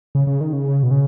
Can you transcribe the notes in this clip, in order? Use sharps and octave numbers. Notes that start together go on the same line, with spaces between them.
C#3
C#3
D#3
C#3
B2
C#3